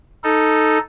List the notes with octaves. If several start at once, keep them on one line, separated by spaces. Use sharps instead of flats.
D#4 A4